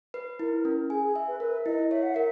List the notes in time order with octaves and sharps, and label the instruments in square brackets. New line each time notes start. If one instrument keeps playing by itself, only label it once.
[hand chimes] B4
[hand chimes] E4 [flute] A#4
[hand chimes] C#4
[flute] G#4 [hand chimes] G#5
[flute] G#4
[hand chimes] E5
[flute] B4
[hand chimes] A#4 [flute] B4
[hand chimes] E4 [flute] D#5
[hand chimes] C#5 [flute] E5
[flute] F#5
[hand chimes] A#4 [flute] E5